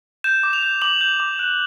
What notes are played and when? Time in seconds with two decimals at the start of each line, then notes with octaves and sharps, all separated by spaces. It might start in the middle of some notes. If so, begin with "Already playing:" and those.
0.24 G6 E7
0.43 D6
0.53 F7
0.62 G6
0.82 D6 F#7
1.01 G6
1.20 D6
1.39 F#6